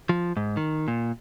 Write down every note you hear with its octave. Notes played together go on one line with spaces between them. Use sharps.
F3
G#2
D#3
A#2